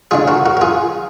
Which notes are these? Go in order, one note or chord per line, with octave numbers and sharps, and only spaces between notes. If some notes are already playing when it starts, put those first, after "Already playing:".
D3 G#3 D4 F4 G#4
F#4 A#4
F#4 A#4
A#4
F4 G#4